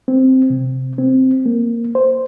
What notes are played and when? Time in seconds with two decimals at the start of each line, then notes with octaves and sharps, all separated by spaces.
0.08 C4
0.50 C3
0.98 C4
1.46 A#3
1.95 C5